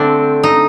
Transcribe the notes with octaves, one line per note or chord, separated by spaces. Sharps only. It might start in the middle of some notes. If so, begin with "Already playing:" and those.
Already playing: D3 A3 C4 D4
D#4